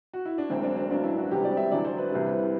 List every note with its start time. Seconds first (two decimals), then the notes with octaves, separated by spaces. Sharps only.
0.14 F#4
0.25 E4
0.38 D4
0.50 E1 D2 D3 F#3 C4
0.63 D4
0.77 C4
0.90 A1 G2 F#3 D4
1.03 E4
1.18 F#4
1.31 E1 E2 C3 G3 G4
1.44 D5
1.57 E5
1.71 E2 D3 F#3 D5
1.85 C5
1.98 B4
2.12 C2 C3 E3 G3